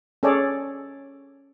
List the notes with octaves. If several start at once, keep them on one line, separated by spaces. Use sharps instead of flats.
C#4 G#4 A4 C#5 D5